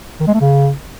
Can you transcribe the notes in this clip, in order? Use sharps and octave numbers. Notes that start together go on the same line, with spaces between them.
D#3
G#3
A3
C#3